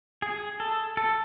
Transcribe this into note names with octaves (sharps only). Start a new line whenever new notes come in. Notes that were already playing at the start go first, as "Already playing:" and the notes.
G#4
A4
A4